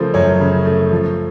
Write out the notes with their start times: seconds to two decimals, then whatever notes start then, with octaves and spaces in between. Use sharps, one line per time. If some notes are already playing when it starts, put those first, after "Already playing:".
Already playing: C#3 F3 A3 A#4 C5
0.14 F#2 C#5
0.40 C#3
0.65 A3
0.91 F3